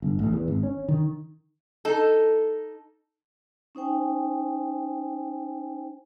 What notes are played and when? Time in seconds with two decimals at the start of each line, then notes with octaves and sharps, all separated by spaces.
0.02 G1
0.19 A1
0.33 E2
0.48 G#1
0.63 C#4
0.88 D#3
1.85 D#4 A4
3.75 C#4 D#4 C5 G5 G#5